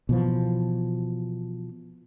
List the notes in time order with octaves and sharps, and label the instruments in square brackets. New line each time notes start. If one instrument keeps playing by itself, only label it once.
[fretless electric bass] B2 E3 F3